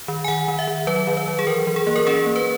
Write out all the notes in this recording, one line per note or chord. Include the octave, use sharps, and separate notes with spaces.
D#3
G#5
D#3 F#5
D#3
E5
D#3
F#3 B4
D#3
B4
F#3
G#4
E3 A#4
E3
G#4
A#3
A#4
C#4 G#4
A#3
B4